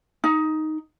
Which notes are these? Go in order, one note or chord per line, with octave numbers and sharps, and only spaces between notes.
D#4